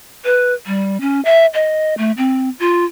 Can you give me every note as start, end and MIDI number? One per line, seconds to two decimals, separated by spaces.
0.25 0.54 71
0.67 0.98 55
1.01 1.21 61
1.25 1.46 76
1.54 1.94 75
1.98 2.11 57
2.18 2.49 60
2.60 2.85 65